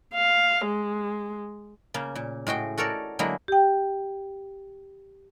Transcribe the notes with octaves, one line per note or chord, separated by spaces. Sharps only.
F5
G#3
C#3 A#3
A#2
A2 G#3 F#4 G5
F#4 A4 A#4 C#5 D5
D3 F#3 G#3 A#3 E4
G4 G5